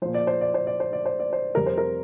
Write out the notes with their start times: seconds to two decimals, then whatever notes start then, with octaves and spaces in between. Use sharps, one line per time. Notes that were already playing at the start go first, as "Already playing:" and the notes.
0.02 A#2 F3 C5
0.14 D5
0.27 C5
0.41 D5
0.54 C5
0.67 D5
0.80 C5
0.93 D5
1.06 C5
1.20 D5
1.33 C5
1.55 F2 C3 G3 A#4
1.66 C5
1.78 A#4